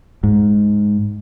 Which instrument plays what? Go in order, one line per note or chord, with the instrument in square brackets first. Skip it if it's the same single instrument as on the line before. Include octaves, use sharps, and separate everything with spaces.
[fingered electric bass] G#2